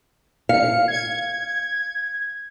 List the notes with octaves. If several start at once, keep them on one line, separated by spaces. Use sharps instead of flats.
F5 C#7
G#6